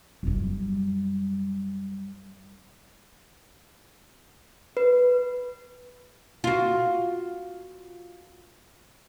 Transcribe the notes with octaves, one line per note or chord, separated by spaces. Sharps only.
F#2 G3
B4
F4 F#4